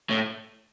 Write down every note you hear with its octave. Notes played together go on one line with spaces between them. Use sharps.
A2